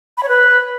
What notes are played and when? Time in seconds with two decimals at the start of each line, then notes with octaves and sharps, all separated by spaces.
0.17 B5
0.23 C#5
0.29 B4